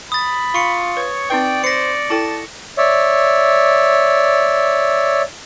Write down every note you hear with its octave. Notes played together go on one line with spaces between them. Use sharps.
B5 D#6 A6
F4 C#6 C#7
B4 C#5
C4 D#4 B4 D5 G5
C5 A#6 C#7
E4 A4 G5 A5
C#5 D5 E5